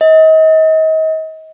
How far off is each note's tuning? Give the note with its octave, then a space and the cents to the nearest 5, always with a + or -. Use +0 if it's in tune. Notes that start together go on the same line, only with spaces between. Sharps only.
D#5 +35